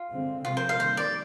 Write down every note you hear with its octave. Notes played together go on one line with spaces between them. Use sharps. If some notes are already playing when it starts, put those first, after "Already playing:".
Already playing: F4
D3 G#3 C4
C3 F3 G#3 C4 F4
C5
F5
D#3 G3 A#3 C5
D5